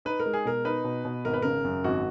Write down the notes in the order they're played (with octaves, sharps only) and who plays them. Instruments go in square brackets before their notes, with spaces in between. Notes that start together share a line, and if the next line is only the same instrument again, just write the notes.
[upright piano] D#4 [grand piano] B4
[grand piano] A#4
[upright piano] G#3
[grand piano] G#4
[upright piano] B2 [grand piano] A#4
[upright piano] D#4 [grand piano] B4
[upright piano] B2
B2
[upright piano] G#1 [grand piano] A#4
[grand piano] B4
[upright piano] C#3 [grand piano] A#4
[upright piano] F#2
[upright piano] G#1 [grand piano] F#4